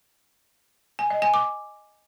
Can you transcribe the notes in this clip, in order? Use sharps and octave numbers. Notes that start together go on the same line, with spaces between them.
G#5
D#5
G#5
D6